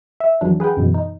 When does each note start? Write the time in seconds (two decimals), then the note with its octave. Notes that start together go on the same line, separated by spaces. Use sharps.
0.20 E5
0.41 F2 E3 F#3 D4
0.60 G#4 B4 F#5 G5
0.77 F#2 B2 E3
0.94 D#4